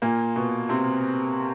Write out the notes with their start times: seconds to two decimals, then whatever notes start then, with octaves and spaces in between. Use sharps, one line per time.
0.02 A#2 A#3
0.36 B2 B3
0.69 C3 C4